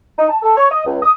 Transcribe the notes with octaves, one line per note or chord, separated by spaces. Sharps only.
D#4
A5
A4
C#5
D#5
C#2
D#6